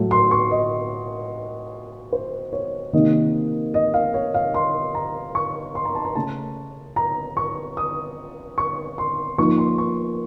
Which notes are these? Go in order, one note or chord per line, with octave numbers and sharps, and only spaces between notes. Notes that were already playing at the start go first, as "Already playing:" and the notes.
Already playing: A2 F#3 A3
C6
C#6
D#5
C5
C#5
C3 D#3 A#3 D#4 D#5
D#5
F5
C#5
F5
C6
A#5
C#6
C6
A#5
A5
A#5
C#3 A3 C#4 A5
A#5
C#6
D#6
C#6
C6
F3 A#3 D#4 C#6
C6
C#6